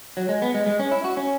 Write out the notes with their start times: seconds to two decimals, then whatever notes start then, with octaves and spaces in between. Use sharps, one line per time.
0.17 F#3
0.29 G#3
0.42 B3
0.54 G#3
0.66 G#3
0.79 C#4
0.91 E4
1.04 F#4
1.17 C#4